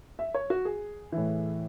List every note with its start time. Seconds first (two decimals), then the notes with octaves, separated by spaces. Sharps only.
0.19 E5
0.34 C#5
0.50 F#4
0.65 G#4
1.12 A2 E3